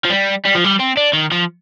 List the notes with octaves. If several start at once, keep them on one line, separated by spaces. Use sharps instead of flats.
F3
G3
G3
F3
G3
C4
D4
D#3
F3